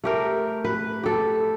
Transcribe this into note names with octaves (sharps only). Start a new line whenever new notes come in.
A3 G4 A#4
B4
G4 A4